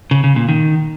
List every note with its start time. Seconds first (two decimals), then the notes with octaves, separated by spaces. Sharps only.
0.11 C#3
0.24 C#3
0.36 A#2
0.48 D#3